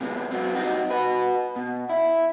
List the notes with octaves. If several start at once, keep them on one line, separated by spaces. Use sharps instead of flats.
C3 G#3 B3
F#3 B3 C4
G3 C4 D#4 F#4 G4
F#4 B4
B2
E4